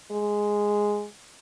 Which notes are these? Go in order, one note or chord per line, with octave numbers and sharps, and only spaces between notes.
G#3